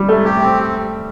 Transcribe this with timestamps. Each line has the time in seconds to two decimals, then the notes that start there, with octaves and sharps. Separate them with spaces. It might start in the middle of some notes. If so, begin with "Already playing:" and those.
Already playing: G3
0.09 C3 A3
0.25 A3 G4
0.41 C4